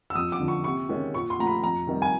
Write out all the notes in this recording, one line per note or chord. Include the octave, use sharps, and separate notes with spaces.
E6
F2 D#6
D6
D3 F3
C#6
C3 C#6
D#3 G#3 C#4
A#2 C#6
C6
F3 A3 A#5
B5
F2 A#5
C3 D#3 G3
G#5